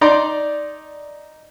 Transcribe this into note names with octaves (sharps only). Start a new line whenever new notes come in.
D#4 D5 A#5 C6